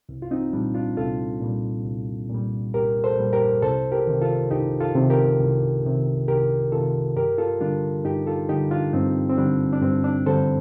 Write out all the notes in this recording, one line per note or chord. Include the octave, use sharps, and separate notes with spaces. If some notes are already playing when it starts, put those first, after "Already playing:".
C2
F4
C4 D#4
A#2 G3 D4
D4 F4
C2 F4 A4
A#2 G3
C2
A#2 G3
C2 G4 A#4
A4 C5
A#2 G3
G4 A#4
C2 A4 C5
G4 A#4
C3 D#3
F4 A4
C2 D#4 G4
F4 A4
C3 D#3
G4 A#4
C2
C3 D#3
C2 G4 A#4
C3 D#3 F4 A4
G2 G4 A#4
F4 A4
D3 G3 D4 F4
G2 D#4 G4
F4 A4
D3 G3 D#4 G4
D4 F4
G2 C4 D#4
C4
D3 G3 D4
D4
G2 C4
D4
D3 G3 A4 C5